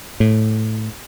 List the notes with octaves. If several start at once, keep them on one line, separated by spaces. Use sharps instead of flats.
A2